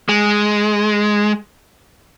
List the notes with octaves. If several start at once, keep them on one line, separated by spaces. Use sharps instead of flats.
G#3